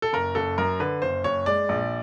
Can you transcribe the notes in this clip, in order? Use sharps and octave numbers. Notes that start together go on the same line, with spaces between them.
A4
F#1 A#4
F#1 A4
F#2 A#4
D3 B4
F#1 C5
F#1 C#5
G#3 D5
A#1